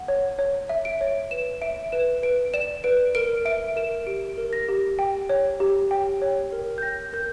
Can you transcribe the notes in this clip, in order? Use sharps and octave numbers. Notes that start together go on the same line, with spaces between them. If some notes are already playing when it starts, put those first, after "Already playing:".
Already playing: F#5
C#5
C#5
E5
D7
C#5
B4 E7
E5 D7
B4 E7
B4 D7
D5 E7
B4 D7
A#4 D7
E5 D7
A#4 E7
G4 D7
A#4
A#6
G4
G5
C#5
G4
G5
C#5
A#4
G6
G5 A#6
A#4 G6